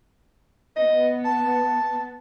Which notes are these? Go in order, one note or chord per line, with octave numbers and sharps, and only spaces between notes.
B3 D#5
A5